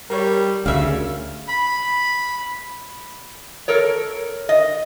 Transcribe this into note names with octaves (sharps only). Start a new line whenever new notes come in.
G3 A#4 C#5
D2 C#3 E5 F5
B5
A4 A#4 C#5
D#5